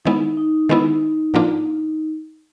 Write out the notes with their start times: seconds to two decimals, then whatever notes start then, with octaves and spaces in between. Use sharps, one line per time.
0.05 D#3 G#3 B3 D#4 E4
0.37 D#4
0.69 D#3 G#3 B3 E4
1.34 A2 F3 A#3 D4 F4